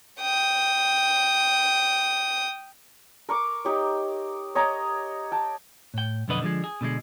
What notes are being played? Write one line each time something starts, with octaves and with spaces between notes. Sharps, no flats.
G5 D#6
A#4 C#6 D6
D#4 G4 C#5
C#5 D#5 G5 A#5
G5 A5
A2 G5
B1 F2 D3 B3 B4 D#5
D3 F3 G#3
G#4
B2 D3 G3 G#3